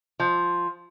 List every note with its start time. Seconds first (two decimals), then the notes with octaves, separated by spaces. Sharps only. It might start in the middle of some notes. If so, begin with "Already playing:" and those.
0.20 F3